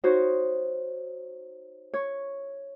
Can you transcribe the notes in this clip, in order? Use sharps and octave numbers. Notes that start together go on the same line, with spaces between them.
D#4 F#4 C5 C#5
C#5